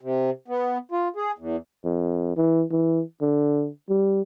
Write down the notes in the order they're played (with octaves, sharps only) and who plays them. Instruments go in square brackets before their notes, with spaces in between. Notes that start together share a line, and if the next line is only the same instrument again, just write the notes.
[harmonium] C3
B3
F4
G#4
E2
[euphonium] F2
E3
E3
D3
G3